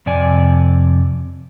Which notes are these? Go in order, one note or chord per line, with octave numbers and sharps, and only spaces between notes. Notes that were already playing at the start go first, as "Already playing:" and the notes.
F2 C3 D5 G#5